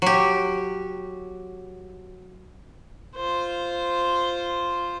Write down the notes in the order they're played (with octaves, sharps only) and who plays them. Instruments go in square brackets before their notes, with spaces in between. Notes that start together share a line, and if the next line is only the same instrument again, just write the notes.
[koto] F#3 G4
[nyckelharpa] F4 C5